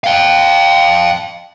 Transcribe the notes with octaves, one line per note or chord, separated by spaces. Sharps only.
F5 G5